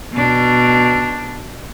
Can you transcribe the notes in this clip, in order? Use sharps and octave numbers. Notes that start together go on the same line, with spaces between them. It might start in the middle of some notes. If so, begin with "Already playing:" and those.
B2 D4